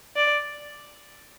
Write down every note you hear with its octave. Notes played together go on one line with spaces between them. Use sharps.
D5